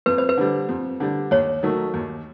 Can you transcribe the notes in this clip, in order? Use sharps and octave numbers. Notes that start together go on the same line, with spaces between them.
F2 B4
C5
B4
D3 G3
F2
D3 G3
D#2 C#5
D#3 F#3 A3
D#2